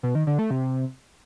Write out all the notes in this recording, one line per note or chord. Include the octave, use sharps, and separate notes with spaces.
B2
D#3
D3
A3
C3